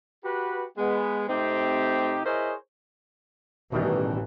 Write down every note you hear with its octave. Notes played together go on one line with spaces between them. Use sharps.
F#4 G4 B4
G#3 B3
C3 A3 C4 D#4 G4
E4 G#4 A#4 C5 C#5 D#5
A1 B2 D#3 E3 G3